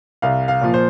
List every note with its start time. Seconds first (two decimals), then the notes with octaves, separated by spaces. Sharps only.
0.22 C2 F5
0.48 F5
0.61 A#2 F3
0.74 C5